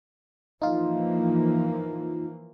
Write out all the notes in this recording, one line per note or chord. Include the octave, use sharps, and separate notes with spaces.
E3 F3 A#3 D#4 F4